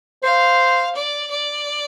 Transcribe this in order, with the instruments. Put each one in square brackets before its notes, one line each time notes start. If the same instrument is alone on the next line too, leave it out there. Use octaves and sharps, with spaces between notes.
[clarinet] C5 [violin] F5
[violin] D5
D5